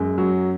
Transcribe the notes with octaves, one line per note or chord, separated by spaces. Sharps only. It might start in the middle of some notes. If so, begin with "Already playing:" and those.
Already playing: F#2 G#3
F#3